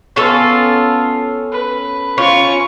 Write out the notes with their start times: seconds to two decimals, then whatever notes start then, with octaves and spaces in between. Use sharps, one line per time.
0.16 B3 C#4 F4 A4
1.52 B4
2.18 C#4 F4 C#6